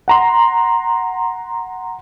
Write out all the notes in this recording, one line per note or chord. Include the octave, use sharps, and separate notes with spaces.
F#5 A#5 C6